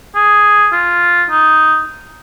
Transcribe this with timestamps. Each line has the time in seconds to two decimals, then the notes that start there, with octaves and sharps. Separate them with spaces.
0.15 G#4
0.72 F4
1.30 D#4